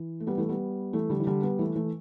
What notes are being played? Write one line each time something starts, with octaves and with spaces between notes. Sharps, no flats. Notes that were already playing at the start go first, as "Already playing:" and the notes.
Already playing: E3
A3
G3 B3
E3 A3
G3 B3
E3 A3
D3 G3
E3
D3 G3
G3 B3
E3 A3
E3 A3